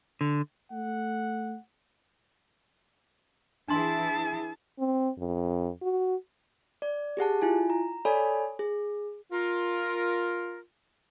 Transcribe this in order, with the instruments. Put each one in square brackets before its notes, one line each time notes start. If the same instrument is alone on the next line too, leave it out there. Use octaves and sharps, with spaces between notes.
[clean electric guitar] D3
[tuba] A3 [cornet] F#5
[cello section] E3 E4 G#4 [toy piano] D4 C6 [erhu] A5
[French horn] C4
F2
F#4
[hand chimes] D5
G4 G#4 F#5 A5
E4 F4 G#5
A#5
A4 C#5 D5 G#5 B5
G#4
[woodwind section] F4 A#4